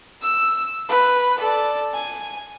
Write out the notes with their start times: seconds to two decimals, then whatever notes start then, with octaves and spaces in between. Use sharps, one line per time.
0.22 E6
0.89 B4
1.39 A4 D5
1.94 G#5